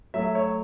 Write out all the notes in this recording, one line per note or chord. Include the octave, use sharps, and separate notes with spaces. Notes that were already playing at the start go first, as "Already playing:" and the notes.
F#3 A3 E5
C#5